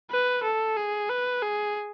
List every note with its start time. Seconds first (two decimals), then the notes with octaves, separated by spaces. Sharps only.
0.11 B4
0.43 A4
0.77 G#4
1.09 B4
1.42 G#4